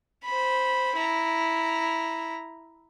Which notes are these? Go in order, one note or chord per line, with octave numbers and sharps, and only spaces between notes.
C5 B5
E4 A#5